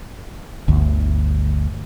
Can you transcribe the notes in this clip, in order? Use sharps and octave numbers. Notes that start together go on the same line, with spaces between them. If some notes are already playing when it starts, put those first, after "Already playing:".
G1 D2